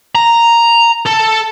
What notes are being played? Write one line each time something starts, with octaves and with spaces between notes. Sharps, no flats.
A#5
A4